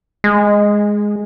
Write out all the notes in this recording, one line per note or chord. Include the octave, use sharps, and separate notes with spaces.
G#3